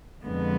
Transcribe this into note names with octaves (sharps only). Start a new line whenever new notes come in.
F2 D3 G#3 B3